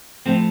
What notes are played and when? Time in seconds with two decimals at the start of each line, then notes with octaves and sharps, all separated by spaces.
0.26 A2 F3 A3 C4